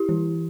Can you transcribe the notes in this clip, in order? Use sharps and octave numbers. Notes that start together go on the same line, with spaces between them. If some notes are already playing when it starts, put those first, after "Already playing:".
Already playing: E4 G4
E3